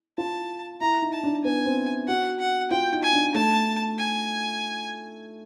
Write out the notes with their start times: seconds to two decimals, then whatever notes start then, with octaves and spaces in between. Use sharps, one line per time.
0.17 F4 A5
0.81 E4 A#5
1.02 D#4
1.13 A5
1.23 D4
1.44 B3 G#5
1.65 C4
2.07 F#4 F#5
2.39 F#5
2.71 F4 G5
2.92 D#4
3.03 G#5
3.13 D4
3.34 A3 A5
3.98 G#5